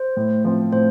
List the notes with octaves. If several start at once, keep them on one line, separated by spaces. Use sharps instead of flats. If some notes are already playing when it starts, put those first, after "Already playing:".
Already playing: C5
A2
F3 C4
A2 C5